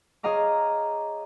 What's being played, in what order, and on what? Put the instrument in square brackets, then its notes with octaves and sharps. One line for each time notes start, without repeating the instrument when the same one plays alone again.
[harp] G#4 C#5 D#5 F5 A#5 D6